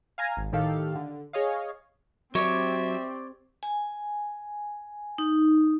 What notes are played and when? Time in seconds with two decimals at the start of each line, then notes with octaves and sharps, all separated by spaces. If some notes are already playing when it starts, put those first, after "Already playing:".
0.18 F5 G#5 A#5
0.37 G#1
0.52 A2 D#3 G4 A4 F5
0.95 D3
1.33 G#4 C#5 D#5 F5
2.35 F#3 C4 G4 C#5 D5 E5
3.63 G#5
5.18 D#4